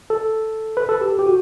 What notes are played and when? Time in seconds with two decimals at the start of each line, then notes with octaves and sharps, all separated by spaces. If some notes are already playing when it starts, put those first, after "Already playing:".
0.10 A4
0.77 B4
0.89 A4
1.01 G4
1.19 G4
1.26 F#4